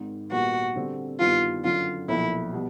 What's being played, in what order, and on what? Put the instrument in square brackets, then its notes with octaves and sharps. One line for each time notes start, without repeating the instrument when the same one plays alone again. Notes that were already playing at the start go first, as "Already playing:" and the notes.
Already playing: [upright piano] G#1 G#2 D#3
[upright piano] A#2 G3 B3 [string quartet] F#4
[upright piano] D3 G3 C4
[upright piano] G2 D#3 G3 B3 E4 [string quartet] F4
[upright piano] F#2 D3 F#3 [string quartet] F4
[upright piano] B1 A#2 F3 [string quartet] E4
[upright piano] B2 G3